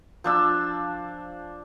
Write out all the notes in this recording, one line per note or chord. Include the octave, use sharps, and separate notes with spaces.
F3 D4 E6